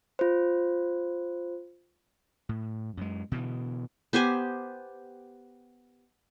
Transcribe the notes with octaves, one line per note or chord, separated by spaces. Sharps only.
F4 C5
A2
F#2 G#3
B2 D3 E3
B3 G4 C5 G#5